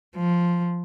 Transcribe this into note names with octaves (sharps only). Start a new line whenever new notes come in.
F3